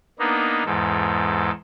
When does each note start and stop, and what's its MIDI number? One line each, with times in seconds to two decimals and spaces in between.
0.19 0.64 58
0.19 0.64 59
0.19 0.64 62
0.19 0.64 63
0.65 1.51 40
0.65 1.51 44
0.65 1.51 69